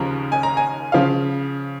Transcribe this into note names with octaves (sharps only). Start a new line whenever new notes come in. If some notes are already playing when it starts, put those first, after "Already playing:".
Already playing: D#2 C#3 F3 A#5
G#5
A#5
G#5
C#3 F3 F5